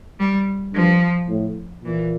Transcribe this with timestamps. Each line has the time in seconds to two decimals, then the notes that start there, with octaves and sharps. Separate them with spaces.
0.19 G3
0.74 G2 F3
1.29 A2
1.84 A#2 E3